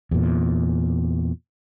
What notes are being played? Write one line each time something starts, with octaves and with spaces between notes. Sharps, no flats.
E2 A#2